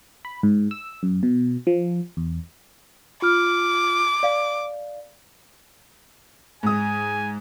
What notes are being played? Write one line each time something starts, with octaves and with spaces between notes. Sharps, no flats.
B5
G#2
E6
F#2
B2
F3
E2
F4 D6 F6
D5 F5
G#2 G#5 D#6